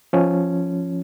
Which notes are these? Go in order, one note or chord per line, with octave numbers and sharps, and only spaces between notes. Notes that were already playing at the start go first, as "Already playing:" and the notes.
F3 C#4